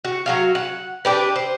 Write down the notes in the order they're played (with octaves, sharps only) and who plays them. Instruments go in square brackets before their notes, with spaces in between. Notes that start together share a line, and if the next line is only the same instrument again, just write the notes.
[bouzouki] F#4
F#3 F#4 F5
F#5
D4 G4 B4
C5